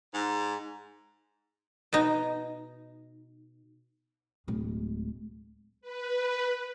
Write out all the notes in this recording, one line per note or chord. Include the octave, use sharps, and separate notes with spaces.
G#2
B2 D#4
D1 G#3
B4